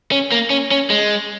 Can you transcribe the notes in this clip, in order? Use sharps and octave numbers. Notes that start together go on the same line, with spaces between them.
C#4
A#3
C#4
C#4
G#3